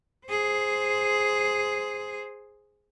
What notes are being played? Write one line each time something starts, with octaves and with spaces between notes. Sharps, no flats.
G#4 C5